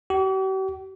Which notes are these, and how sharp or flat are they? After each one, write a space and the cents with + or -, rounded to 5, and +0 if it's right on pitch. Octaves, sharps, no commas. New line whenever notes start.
G4 -45